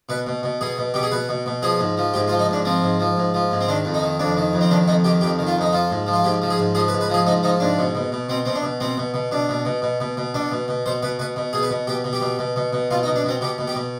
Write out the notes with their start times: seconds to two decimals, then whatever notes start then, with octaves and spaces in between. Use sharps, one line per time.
0.09 B2 B4
0.27 B2
0.43 B2
0.61 B2 G#4
0.78 B2
0.94 B2 G4
1.03 G#4
1.12 B2 B4
1.29 B2
1.46 B2
1.62 F3 G#4
1.80 G#2
1.98 F3
2.14 G#2 G4
2.28 F4
2.31 F3
2.39 D#4
2.49 G#2 D4
2.65 F3 C4
2.82 G#2
3.00 F3
3.17 G#2
3.34 F3
3.51 G#2
3.61 C4
3.68 D#3 D4
3.85 F2
3.94 D#4
4.02 D#3
4.19 F2 D4
4.37 D#3
4.53 F2
4.61 C4
4.70 D#3 D4
4.88 F2 D#4
5.04 D#3 G4
5.21 F2 G4
5.39 D#3
5.47 F4
5.56 F2 D#4
5.73 F3 F4
5.91 G#2
6.06 F3
6.14 F4
6.24 G#2 G4
6.42 F3
6.50 G#4
6.58 G#2
6.75 F3 G#4
6.88 B4
6.93 G#2
7.01 B4
7.10 F3 G#4
7.27 G#2 D#4
7.43 F3 D#4
7.60 G#2 D4
7.78 B2
7.95 B2
8.12 B2
8.29 B2 C4
8.45 B2 C4
8.55 D4
8.63 B2
8.80 B2 C4
8.97 B2
9.14 B2
9.31 B2 D4
9.49 B2
9.65 B2
9.82 B2
10.00 B2
10.17 B2
10.34 B2 D4
10.52 B2
10.68 B2
10.86 B2 C5
11.03 B2 B4
11.19 B2 B4
11.36 B2
11.53 B2 G#4
11.63 B4
11.70 B2
11.87 B2 G4
12.04 B2
12.13 G4
12.21 B2
12.39 B2
12.56 B2
12.73 B2
12.90 B2 F4
13.03 D#4
13.07 B2
13.16 D4
13.24 B2 C4
13.41 B2 G4
13.58 B2
13.67 G4
13.75 B2